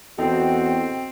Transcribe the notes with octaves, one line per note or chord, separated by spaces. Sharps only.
E2 C4 F#4 A4 D#5 G5